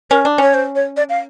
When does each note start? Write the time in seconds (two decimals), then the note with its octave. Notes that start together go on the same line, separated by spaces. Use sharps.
0.11 C#4 A#4
0.25 D4
0.38 C#4 C#5
0.54 C5
0.75 C#5
0.97 D5
1.09 F5